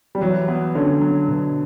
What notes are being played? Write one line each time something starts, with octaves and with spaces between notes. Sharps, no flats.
G3
E3 F#3
B3
D3 C#4
F#3
B2